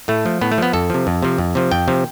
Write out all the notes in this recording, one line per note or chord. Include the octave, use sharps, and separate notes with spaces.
A2 A3
F3
A2 B3
A3
F3 B3
F2 A4
C3 F3
F2
C3 F3
F2
C3 F3
F2 G5
C3 F3